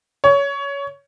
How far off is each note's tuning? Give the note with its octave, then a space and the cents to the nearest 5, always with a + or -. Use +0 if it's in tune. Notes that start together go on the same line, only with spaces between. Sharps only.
C#5 +20